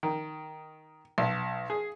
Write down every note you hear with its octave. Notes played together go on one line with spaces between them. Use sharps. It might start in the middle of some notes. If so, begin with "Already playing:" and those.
D#3
B1
G#4